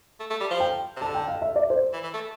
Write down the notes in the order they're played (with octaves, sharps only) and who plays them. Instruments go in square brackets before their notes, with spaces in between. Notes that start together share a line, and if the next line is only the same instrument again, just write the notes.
[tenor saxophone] A3
A3
G3
F3
[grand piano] G5
[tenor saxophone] C3
[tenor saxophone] D3 [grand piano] A5
[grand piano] G5
F5
E5
D5
C5
[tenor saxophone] E3
E3
A3